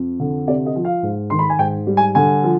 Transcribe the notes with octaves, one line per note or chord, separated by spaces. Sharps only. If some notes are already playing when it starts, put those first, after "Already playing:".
Already playing: F2
D3
C3 D5
D#5
F3
F5
G#2
D#3 C6
B5
G#5
G#2 G5
G3
G#5
D3 G#5
F3